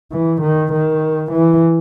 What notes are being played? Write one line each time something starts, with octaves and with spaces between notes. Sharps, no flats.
E3
D#3
D#3
E3